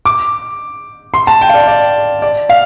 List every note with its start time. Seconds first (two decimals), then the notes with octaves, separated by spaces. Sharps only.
0.05 D6
1.14 C6
1.27 A5
1.41 G5
1.49 F5
1.54 D5
1.68 D5
2.22 D5
2.49 F5